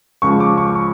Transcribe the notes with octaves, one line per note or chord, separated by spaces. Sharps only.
C#2 C#3 F3 C#6
D6
C#6
C#6